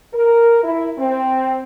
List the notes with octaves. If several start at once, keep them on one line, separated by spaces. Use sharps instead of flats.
A#4
E4
C4